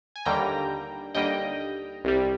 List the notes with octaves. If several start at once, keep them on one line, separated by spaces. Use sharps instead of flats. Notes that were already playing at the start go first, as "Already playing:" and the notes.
G#5
D#2 D3 G3 A#3 G5 A#5
D#2 D3 G3 A#3 D#5 G5
C2 C3 G3